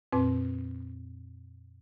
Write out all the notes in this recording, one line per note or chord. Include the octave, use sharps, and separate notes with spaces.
F2 A#2 C4 B4